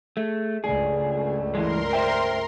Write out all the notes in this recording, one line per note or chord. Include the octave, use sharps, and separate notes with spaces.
A3 G#4
C#2 G2 A3 G#4 D5
E3 G#3 A#4 C6
C5 E5 G5